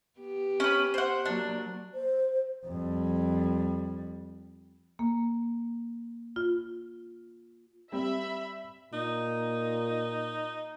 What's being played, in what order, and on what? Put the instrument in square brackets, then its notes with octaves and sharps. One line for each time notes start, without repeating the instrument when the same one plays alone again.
[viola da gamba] B3 G4
[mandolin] C#4 B4
C5 F#5
[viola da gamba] F#3 A#3 [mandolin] D4
[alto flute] C5
[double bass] F2 G3
[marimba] A#3
F4
[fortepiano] G3 C4 [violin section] E5 B5
[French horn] A#2 [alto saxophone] D#4